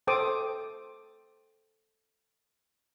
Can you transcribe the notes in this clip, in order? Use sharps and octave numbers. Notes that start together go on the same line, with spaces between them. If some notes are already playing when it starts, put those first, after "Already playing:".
A4 C5 G5 D6 D#6